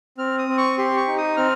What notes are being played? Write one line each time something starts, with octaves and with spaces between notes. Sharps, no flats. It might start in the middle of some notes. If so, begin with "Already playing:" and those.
C4 F6
D#6
C4
C#6
G4 C6
C#6
D#4
D#6
C4 F6